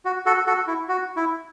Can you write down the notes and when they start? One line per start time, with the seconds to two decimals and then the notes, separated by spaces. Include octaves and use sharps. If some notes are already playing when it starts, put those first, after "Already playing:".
0.05 F#4
0.26 F#4 A4
0.46 F#4 A4
0.67 E4
0.89 F#4
1.16 E4